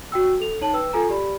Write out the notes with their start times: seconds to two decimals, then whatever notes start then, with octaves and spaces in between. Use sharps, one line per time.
0.12 F#4 G5 E6
0.40 A4 F7
0.61 D#4 C#5 A5 F#7
0.74 B4 G5 E6
0.93 F4 A4 G#5 A#5
1.09 G4 D5 B5